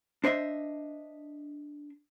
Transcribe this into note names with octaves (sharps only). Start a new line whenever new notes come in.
D4 C5 D#5 E5